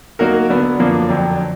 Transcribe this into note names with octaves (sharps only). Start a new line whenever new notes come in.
F#3 A#3 D#4 F#4 A#4
D3 F#3 B3
F#2 D3 F3 A#3 D4
F2 D3 F#3